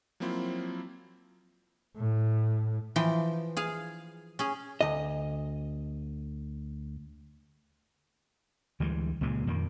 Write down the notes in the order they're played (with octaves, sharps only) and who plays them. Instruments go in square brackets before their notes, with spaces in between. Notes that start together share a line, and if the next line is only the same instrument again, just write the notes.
[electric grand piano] F3 F#3 A#3 C4 E4 F4
[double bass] A2
[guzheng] E3 F3 G5
G#4 F5
C#4 G#4
[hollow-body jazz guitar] D2 D#5
[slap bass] D2 E3 G3 G#3
C#2 A#2 C#3 G#3
F2 A#2 D#3 A#3